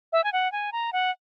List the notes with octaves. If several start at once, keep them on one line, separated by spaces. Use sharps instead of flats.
E5
G#5
F#5
G#5
A#5
F#5